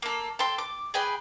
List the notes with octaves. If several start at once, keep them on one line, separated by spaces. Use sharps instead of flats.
A#3 A4
A4 G5 C6
D6
G#4 B4 G5 G#5